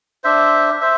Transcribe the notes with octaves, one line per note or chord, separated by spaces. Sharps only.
D4 C5 E5
C5 E5